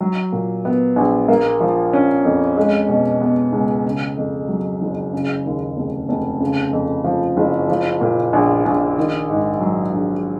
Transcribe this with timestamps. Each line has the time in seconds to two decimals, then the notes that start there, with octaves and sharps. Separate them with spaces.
0.01 F#3
0.32 A#2
0.65 B3
0.96 A#1
1.28 A#3
1.60 F3
1.93 C#4
2.25 F2
2.57 G#3
2.88 B2
3.21 B3
3.52 C#2
3.85 C#3
4.17 F2
4.48 F#3
4.81 F#1
5.13 C#3
5.45 D#2
5.77 F1
6.09 F1
6.40 C#3
6.73 F2
7.04 F3
7.37 F#1
7.68 F3
8.01 A#2
8.33 A#1
8.65 A#1
8.98 D#3
9.30 G#2
9.60 F#3
9.93 A#1